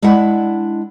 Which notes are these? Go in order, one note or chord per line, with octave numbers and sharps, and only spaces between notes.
G#3 D4 E4 E5 F#5